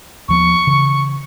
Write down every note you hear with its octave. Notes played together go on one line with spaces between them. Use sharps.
D#2 F3 B3 C#6
C#3 E3